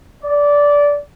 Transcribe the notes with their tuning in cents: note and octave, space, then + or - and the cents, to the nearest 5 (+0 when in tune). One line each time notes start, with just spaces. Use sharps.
D5 -15